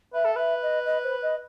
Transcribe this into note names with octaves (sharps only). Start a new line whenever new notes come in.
B4 E5
A4
B4 E5
D#5
D#5
C5
D#5